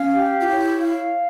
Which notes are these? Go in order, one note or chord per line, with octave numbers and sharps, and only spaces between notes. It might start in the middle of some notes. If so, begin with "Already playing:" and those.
Already playing: C#4 F5
G4
F4
E4 C#5
F5